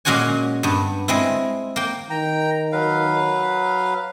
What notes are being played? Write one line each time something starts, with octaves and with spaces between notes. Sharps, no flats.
A#2 G#3 C#4 F#4 C#5 G#5
G2 B3
G#3 C4 E4
A#3 G5
D#3 G5 A#5
F#3 B4 F5